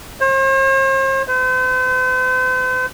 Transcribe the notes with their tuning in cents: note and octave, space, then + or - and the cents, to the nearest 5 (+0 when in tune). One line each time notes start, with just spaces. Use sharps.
C5 +45
C5 -45